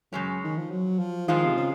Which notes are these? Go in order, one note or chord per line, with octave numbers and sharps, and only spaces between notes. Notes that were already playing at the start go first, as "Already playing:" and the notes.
F#2 C#3 G#3 C#4
D#3
F3
F#3
F3
G#2 D#3 F3 G#3 F4
C3
C#3